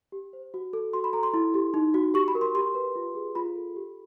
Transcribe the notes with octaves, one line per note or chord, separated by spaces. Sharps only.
G4
C5
F#4
A4
F#4 C6
B5
A4 A#5
C6
E4
G4
D#4
F#4
G4 C#6
B5
A#4
C6
G4 C6
B4
F4
G#4
F4 B5
A4
G4